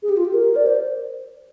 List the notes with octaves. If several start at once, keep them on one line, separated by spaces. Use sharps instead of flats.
G#4
G4
F4
G4
A#4
D5
C5